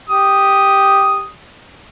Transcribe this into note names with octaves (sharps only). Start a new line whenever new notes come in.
G4 D#6